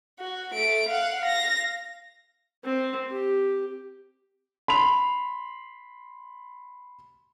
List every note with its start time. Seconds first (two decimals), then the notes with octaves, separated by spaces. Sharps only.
0.19 F#4
0.54 A3 D7
0.89 F5 F#5
1.21 F5 A#6
2.64 C4
3.11 G4
4.68 B5 C6 F7